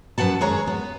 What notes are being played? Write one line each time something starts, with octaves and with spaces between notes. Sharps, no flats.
F#2 C3 B4 F#5 A5
D#2 G#3 C#5 A#5
B3